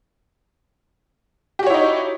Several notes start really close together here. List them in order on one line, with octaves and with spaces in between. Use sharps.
G4 F#4 C#5 E4 D#4